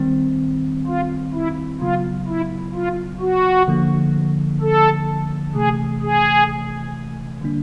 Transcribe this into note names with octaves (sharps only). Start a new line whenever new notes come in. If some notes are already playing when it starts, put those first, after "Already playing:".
Already playing: D#3 G3 C4
F4
E4
C#3 F#3 B3 F4
E4
F4
F#4
D3 F3 A#3
A4
C3 E3 A3 G#4
G#4
D3 G3 A#3 D4